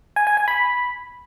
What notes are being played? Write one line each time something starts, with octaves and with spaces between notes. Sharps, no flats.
G#5
G#5
G#5
B5